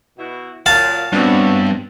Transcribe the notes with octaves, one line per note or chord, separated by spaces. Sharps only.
B2 E4 F#4
A#2 F#3 F5 A5
G2 B3 C4 D4 F#4 C#5 E5